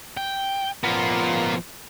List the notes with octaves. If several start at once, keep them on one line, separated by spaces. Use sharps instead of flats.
G5
F3 A#3 B3 F4